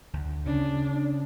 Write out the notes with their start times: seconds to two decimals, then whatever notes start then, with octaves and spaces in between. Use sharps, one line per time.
0.13 D2
0.46 C#3 C#4 D4